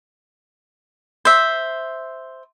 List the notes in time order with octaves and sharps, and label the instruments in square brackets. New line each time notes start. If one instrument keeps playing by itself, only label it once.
[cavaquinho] C5 E5